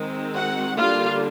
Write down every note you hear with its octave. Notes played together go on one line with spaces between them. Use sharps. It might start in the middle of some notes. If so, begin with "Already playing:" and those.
Already playing: D#3 G#3 C4
F#4 F#5
D3 G3 A#3 D4 F4 F5